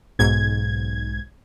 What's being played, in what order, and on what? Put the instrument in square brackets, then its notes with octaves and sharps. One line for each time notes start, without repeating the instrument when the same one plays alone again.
[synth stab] B1 G#2 G#6